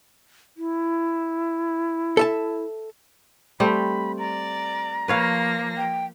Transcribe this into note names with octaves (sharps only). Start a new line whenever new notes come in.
E4
A4 E5 A5
G3 A3 C4 B5
D5 A#5
F3 A#3 B4 C#5 F5 A#6
G5